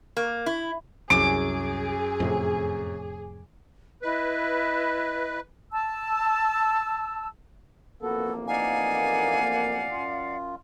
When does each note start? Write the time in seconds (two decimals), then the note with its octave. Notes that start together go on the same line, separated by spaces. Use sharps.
0.17 A#3
0.46 E4
1.10 C2 F#2 G#4 D6
2.20 F2 A2 C3
4.02 E4 B4 D#5
5.72 A5 E6
8.02 A1 F2 A#3 B3 F#4 A4
8.47 E3 D#4 D5 F5 F#5 G#5
9.91 F#2 F4